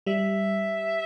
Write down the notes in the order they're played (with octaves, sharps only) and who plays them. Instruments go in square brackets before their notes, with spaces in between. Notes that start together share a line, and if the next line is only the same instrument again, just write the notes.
[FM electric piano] G3 [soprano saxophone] E5